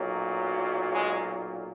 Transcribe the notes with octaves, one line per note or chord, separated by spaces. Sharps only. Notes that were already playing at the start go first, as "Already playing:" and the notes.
Already playing: B1 A#2 F#3
G#3